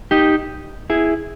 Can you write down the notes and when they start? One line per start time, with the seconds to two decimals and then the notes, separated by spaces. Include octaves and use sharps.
0.11 D#4 G4
0.90 E4 G#4